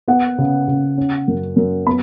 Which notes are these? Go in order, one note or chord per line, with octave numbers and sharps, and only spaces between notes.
B3 F#5
C#3
C#3
C#4
F#2
F#2
B3 B5